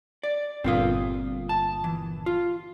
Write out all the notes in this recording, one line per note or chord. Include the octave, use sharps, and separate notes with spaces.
D5
G1 A#2 C4 F4 F5 D#6
A5
E3
F4